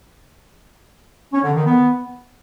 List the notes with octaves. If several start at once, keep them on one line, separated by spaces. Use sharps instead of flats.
C#4
D3
D#3
B3